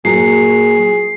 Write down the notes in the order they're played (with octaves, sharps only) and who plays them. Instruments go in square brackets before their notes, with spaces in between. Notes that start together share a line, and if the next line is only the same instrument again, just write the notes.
[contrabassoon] A#2 [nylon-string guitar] F#3 [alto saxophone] G#4 [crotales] C7